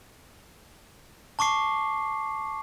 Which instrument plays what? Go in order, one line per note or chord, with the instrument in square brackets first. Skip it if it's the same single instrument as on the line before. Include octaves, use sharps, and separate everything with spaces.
[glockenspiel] A5 C#6 D6 C7